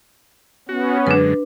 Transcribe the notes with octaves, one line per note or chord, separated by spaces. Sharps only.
B3 C#4 F#4
F#2 D3 G#3 D4 B4